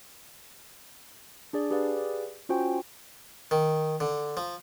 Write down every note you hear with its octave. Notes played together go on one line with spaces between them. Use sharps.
D4 G#4 D5
G4 G#4 B4 D5 F5
C#4 F4 F#4 C5 G5 G#5
D#3
D3
F3